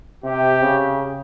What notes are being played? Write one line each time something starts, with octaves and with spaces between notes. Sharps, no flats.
C3 G4
C#3